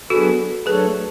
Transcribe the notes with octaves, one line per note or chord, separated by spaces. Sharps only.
F#3 B3 D4 F#4 G#4 A4 B4
F#3 A3 D4 G#4 A4 B4 C#5